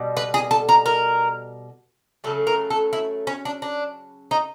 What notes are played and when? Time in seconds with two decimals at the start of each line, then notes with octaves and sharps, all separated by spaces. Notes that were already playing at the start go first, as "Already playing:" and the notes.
Already playing: B2 G3
0.17 B4
0.34 G#4
0.51 A4
0.69 A#4
0.86 A#4
2.24 C#3 F#3 A3 A4
2.47 A#4
2.70 A4
2.93 E4
3.27 C#4
3.45 D4
3.62 D4
4.31 D#4